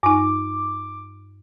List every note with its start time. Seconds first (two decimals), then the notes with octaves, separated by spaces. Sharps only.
0.03 G2 D#4 D6